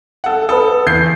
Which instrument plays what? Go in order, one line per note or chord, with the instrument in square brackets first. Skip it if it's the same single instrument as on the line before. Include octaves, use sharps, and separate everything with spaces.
[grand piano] A4 F#5
[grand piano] A4 [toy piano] B4 B5 D#6
[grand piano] E2 G6 C7